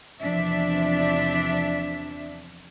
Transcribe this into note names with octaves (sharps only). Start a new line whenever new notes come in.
E2 C3 F3 D4 E5